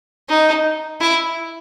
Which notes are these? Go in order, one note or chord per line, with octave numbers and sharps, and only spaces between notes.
D#4
E4